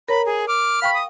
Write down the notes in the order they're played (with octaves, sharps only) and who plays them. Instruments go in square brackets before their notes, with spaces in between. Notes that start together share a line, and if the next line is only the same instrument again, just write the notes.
[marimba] A#4 C#5 A#5 [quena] B5
[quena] G#4
[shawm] D6 [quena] F6
[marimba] F5 G5 C#6 [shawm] B5
[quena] D#6